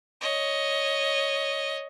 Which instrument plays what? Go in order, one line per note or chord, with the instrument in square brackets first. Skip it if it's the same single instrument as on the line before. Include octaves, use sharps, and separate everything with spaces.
[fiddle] C#5 D#5